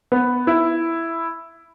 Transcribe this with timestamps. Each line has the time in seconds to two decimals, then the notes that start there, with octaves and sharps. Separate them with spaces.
0.12 B3
0.47 E4